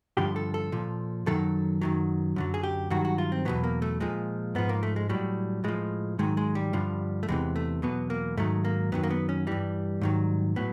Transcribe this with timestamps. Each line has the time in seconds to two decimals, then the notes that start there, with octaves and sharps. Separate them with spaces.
0.17 G2 D3 F3 G4
0.36 A4
0.54 A4
0.72 A#2 F3
1.26 F#2 D#3 F#3 A4
1.81 F#2 D#3 F#3
2.36 F#2 D3 F#3
2.54 G#4
2.63 G4
2.90 G2 D#3 F#3 F#4
3.05 F#4
3.18 F4
3.32 C4
3.45 E2 B2 F#3 B3
3.64 A#3
3.82 A3
4.00 A#2 F3 G#3
4.55 G#2 F3 B3
4.69 A#3
4.83 A3
4.96 G#3
5.09 A2 F#3 G3
5.64 A2 F3 G#3
6.19 G#2 D#3 F#3 G#3
6.37 G#3
6.55 G3
6.73 G2 D3 F3
7.23 A3
7.28 E2 C3 E3 G#3
7.56 A3
7.82 E2 B2 F#3 B3
8.10 A#3
8.37 G#2 D#3 F#3 A3
8.65 A#3
8.92 F#2 D#3 F#3 B3
9.03 A#3
9.10 B3
9.29 C#4
9.47 G2 E3 G3
10.01 G#2 D#3 F#3
10.56 A2 F#3 B3